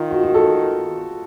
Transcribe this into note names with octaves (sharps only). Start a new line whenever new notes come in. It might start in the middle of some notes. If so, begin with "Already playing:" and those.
Already playing: D#3 F4
F#4
F#4
A4